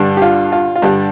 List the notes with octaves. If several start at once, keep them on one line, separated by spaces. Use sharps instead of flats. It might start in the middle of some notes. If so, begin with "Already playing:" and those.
Already playing: G2 D3 G3
G4
F4
F4
F4
G2 D3 G3 G4